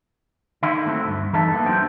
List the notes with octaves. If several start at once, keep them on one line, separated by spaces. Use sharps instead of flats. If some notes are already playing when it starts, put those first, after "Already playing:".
D3 D#3 E4
A3 C4 F#4
D2 G2
F#2 E3 D#4 A4 E5 A5
A#3 B3 E4 A4
F#3 G3 D4 F#4 C5 G5